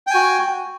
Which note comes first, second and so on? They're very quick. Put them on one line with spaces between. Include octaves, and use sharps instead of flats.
G5 G#5 F#4